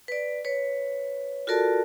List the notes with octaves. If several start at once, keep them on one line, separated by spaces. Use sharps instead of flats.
B4 D5
B4 C#5
F4 F#4 A4 A#4 D5 A5